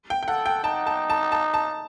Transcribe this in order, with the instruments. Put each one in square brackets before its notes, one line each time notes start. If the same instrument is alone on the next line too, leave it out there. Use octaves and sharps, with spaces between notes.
[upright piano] G5
G5
[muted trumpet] A4 [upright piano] F#5
[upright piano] G5
[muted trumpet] D#4 [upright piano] A5
[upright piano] A5
A5
A5
A5